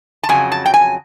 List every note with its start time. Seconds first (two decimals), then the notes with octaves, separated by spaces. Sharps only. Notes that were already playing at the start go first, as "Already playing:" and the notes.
0.23 A5
0.29 F2 C#3 F#3 G#5
0.52 A5
0.66 G5
0.74 G#5